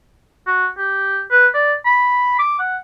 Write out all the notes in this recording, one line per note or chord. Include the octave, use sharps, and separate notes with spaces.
F#4
G4
B4
D5
B5
D6
F#5